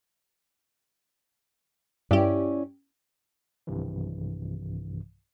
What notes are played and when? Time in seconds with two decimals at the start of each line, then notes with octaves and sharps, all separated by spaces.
2.11 G2 C#4 E4 G4 D5
3.67 B1 G2 C3 D#3 E3